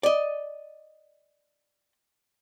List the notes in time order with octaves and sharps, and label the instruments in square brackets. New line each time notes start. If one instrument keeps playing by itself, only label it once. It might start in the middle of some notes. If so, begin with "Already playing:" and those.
[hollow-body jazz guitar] D5 D#5